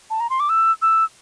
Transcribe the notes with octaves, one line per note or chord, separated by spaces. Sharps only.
A5
A#5
C6
D6
E6
E6